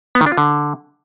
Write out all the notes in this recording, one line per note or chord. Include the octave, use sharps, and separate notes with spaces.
B3
D#3
D4
F4
D3